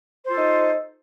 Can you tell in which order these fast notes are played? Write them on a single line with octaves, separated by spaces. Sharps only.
C5 F4 A4 D#4